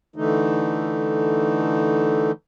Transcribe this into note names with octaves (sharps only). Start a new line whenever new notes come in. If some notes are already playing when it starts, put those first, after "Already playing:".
D3 E3 A3 D#4